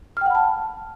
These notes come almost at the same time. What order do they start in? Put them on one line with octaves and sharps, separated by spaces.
F6 G5 F#5 B5 A5